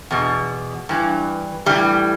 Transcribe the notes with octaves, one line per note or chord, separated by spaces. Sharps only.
E2 B2
G2 E3
A2 E3 G3